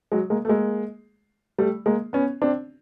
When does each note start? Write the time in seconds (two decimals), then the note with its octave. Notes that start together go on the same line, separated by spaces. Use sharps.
0.12 F#3 G#3
0.30 G#3 A#3
0.45 A3
0.48 G#3 A#3
1.58 G3 A3
1.86 G#3 A#3
2.13 B3 C#4
2.42 C4 D4